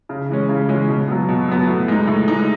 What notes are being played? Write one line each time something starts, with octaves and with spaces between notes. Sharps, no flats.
C#3
E3 G#3 C#4
C#3
E3 G#3 C#4
B2
F#3 B3
B2
F#3 B3
A2
G#3 D#4
A2
G#3 D#4